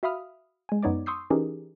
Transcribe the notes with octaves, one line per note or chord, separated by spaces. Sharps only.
F#4 E5 F5 B5 D#6 F6
G#3 G#5
F#2 B3 D#4 C#5 D5 D6
C6 C#6 D#6 E6 G6 C7
E3 C#4 D#4 G4 G#4 A#4